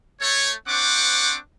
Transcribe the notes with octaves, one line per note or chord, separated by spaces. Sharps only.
A3 C#5
C4 D4 C5 F#5 C#6 D6